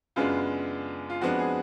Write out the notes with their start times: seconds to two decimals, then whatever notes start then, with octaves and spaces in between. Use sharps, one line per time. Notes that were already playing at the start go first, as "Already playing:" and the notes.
0.16 F#2 C#3 G#3 B3 D4 F4
1.10 F4
1.21 F2 F3 G#3 B3 D4 F#4
1.39 G#4